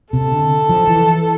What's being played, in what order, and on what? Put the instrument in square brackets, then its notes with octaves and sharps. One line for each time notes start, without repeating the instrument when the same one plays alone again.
[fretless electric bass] C3 [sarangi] A4
[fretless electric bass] D3
F3
E3